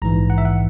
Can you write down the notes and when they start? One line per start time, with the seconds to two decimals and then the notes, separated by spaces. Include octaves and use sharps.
0.02 A#1 G#2 E3 A#5
0.30 F#5
0.38 E5
0.45 F#5